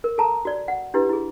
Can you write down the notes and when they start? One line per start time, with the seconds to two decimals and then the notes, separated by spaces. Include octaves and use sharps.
0.04 A#4
0.18 A4 A5 A#5
0.45 F#4 D5
0.68 F#5
0.94 D4 E4 G4 B4
1.09 E4 G#4